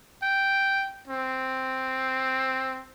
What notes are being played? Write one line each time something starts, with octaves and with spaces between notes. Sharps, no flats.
G5
C4